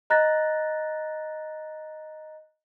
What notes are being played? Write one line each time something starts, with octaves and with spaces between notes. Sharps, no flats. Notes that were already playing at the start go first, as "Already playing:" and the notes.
D#5 A#5 F#6 A6 A#6